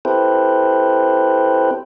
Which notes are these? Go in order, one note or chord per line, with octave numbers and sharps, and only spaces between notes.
C4 E4 G4 A4 B4 C5